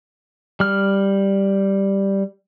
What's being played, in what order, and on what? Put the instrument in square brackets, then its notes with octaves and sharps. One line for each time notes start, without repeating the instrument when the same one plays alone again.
[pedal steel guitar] G3 F6